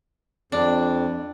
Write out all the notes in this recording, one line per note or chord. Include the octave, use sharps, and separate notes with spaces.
F2 D4